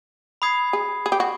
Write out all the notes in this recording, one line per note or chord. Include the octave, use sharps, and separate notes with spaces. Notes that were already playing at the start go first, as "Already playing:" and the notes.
B5 D#6 G#6 C7
G#4
G#4
G4
F#4